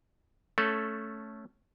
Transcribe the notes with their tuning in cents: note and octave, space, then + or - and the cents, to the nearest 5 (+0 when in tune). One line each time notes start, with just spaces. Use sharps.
A3 +0 C#4 +5 A4 +0